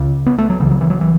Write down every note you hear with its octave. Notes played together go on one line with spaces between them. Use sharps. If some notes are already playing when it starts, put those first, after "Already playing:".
Already playing: C#2 C#3
B3
A3
F#3
C#2 C#3 E3
F#3
E3
F#3
E3